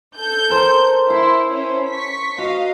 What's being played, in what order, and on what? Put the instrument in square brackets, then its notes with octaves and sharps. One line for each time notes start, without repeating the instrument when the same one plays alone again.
[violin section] A4 G6
[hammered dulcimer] A#4 C5 A5
[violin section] E4 [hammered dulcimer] C6
[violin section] C#4 E4 C5
C#6 B6
[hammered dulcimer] F#4 [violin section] D#5 F5